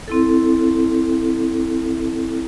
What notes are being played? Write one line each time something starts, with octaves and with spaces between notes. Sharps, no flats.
C4 E4 A4